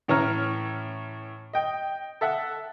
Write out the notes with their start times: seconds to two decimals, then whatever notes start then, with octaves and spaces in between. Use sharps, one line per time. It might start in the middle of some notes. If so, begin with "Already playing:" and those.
0.08 A2 E3 C#4 C#5 A#5 F6
1.53 D#5 G5
2.21 A4 E5 F#5